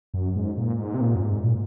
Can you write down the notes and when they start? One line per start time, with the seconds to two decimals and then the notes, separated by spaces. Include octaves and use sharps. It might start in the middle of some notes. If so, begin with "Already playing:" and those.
0.14 F#2
0.36 G#2
0.57 A#2
0.79 G#2
0.94 C3
1.01 A#2
1.15 F#2
1.22 G#2
1.43 A#2